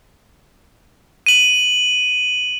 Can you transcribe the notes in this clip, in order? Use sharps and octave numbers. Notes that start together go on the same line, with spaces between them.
D#7 F#7